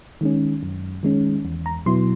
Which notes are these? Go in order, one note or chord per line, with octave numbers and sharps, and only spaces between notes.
D#3 G#3 C#4
F#2
D#3 G#3 C#4
E2
A#5
B2 F#3 B3 E4 C6